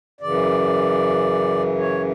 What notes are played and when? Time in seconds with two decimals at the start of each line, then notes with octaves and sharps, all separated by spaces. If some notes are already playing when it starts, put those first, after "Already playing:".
0.21 F#2 C#3 E3 D5
1.78 C#5